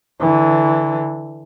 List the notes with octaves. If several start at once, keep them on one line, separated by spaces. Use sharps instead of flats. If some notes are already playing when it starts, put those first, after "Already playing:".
D3 E3